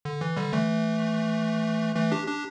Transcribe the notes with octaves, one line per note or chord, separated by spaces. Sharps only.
D3
E3
D3 G3
E3 A3
E3 A3
D4 G4
D4 G4